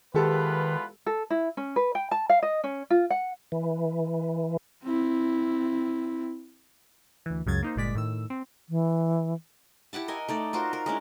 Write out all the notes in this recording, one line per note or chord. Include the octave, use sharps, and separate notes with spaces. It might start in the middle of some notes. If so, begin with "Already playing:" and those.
E2 D#3 G#3 F4 G4 A4 B4
A4
E4
C#4
B4
G5
A5
F5
D#5
C#4
F4
F#5
E3
C4 E4
D2 E3
C#2 F#2 C#3 F#3 G#6 A6
A#3 D#4 C5
G1 A#2 G#3 D5 B6
A2 D#3 E6
C4
E3
E4 G4 F#5 A5
A#4 D#5 G#5
A3 D#4 D5
F4 F#4 A#4 C5
A#4
G#3 C#4 D4 E4